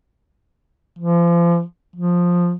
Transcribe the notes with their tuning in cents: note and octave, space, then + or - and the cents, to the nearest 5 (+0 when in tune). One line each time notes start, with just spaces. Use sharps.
F3 -35
F3 +10